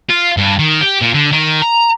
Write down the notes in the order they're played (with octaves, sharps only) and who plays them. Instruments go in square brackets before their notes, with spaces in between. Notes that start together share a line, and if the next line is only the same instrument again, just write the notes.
[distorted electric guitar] F4
G2
D#3
G4
A#2
D3
D#3
A#5